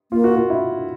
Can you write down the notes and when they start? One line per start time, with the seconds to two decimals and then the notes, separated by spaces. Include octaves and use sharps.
0.12 A#3 F4
0.24 F#4
0.36 F4
0.50 E4